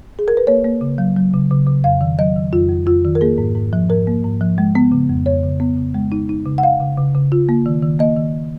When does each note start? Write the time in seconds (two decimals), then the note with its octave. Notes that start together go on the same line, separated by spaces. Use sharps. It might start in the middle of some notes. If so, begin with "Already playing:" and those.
0.19 G#4
0.28 A#4
0.37 B4
0.47 A#3 C#5
0.65 A#3
0.81 C#3
0.98 F#3
1.16 F#3
1.33 C#3
1.51 C#3
1.67 C#3
1.84 F2 F5
2.01 D#3
2.19 F#3 D#5
2.36 D#3
2.53 F2 F4
2.69 F2
2.87 F2 F4
3.05 D#3
3.15 A#4
3.21 A#3 G#4
3.38 G#2
3.55 G#2
3.73 F3
3.89 G#2 A#4
4.07 A#3
4.24 G#2
4.41 F3
4.58 G#3
4.75 B3
4.92 C#3
5.09 F2
5.26 F2 C#5
5.44 C#3
5.60 B3
5.77 C#3
5.94 G#3
6.12 D#4
6.29 D#4
6.46 C#3
6.58 F#5
6.63 C#3 F5
6.81 C#3
6.97 C#3
7.15 C#3
7.32 F4
7.49 A#3
7.66 D#3
7.82 D#3
7.99 A#3 D#5
8.17 D#3